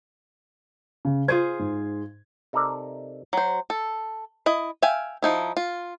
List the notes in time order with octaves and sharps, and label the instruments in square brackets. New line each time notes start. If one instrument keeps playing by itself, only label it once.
[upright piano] C#3
[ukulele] F4 G#4 C5 [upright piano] G#6
[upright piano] G#2
[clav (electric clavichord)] C3 D#4 A4 A#4 D5
[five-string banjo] F#3 C5
A4
E4 D#5
E5 F5 G5 G#5
F3 D#4 E4
F4